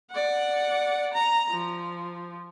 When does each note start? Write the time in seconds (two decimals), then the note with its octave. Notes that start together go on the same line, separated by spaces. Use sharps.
0.11 D5 F#5
1.13 A#5
1.50 F3